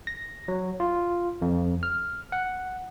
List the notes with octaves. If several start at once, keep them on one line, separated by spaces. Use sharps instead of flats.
A#6
F#3
F4
F2
F6
F#5